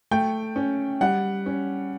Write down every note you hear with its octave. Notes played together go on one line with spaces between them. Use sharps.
A3 G5
C#4
G3 F#5
C#4